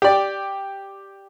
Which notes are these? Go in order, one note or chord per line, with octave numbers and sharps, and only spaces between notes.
G4 D5